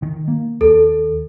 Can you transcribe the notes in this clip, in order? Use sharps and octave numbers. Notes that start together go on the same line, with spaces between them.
D#3
A#3
D#2 A4